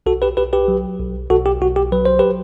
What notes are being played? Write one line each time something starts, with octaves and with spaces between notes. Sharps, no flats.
B1 F#4 A4
G4 B4
B1 G4 B4
G4 B4
F#3
B1
B1 F#4 A4
G4
B1 F#4
G4
F#3 B4
C5
G4 B4